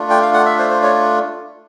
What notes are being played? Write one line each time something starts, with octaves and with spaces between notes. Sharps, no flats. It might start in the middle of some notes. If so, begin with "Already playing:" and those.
Already playing: A3 D4 F4
G5
F5
F#5
E5
C5
C5
C#5